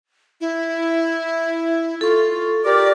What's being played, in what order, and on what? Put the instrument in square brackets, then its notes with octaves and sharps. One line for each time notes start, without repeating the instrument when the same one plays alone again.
[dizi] E4
[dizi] F4 [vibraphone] A4 C#6
[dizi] G4 [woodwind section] A#4 D5